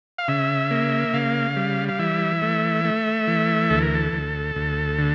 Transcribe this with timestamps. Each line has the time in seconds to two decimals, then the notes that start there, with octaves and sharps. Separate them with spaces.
0.18 F5
0.28 C#3 E5
0.71 A#3
1.13 C#3 F5
1.56 G3
1.89 F5
1.99 E3 E5
2.42 A3
2.85 A3
3.27 E3
3.70 D2 A4
3.82 A#4
3.95 A4
4.13 D2
4.56 D2
4.98 D3